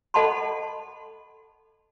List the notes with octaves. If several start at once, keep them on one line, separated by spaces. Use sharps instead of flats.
A4 D#5 F#5 A5 B5 C6